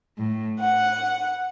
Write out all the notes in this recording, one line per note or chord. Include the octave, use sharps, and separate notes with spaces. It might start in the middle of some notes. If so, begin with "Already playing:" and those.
A2
F#5